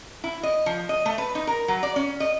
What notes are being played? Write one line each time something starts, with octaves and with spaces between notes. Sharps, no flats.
E4
D#5
F3
D#5
A3
B4
D#4
A#4
F#3
D5
C#4
D#5